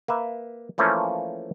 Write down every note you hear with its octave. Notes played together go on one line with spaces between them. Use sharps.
A#3 B4 E5
E3 F3 A3 A#3 C#4